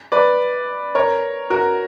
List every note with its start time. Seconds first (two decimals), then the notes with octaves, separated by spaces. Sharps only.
0.12 B4 D5
0.95 A#4 C#5
1.50 F#4 A#4